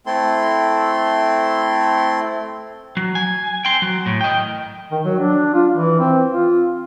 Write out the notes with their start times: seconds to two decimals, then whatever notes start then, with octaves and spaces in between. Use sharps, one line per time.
0.06 A3 C4 E4 A4 C6
2.97 F#3
3.15 G#5
3.65 G5 C6
3.82 F#3
4.06 A2
4.21 D#5 G5
4.91 D#3
5.05 F#3
5.19 D4
5.54 F4
5.73 E3
5.99 C4
6.30 F4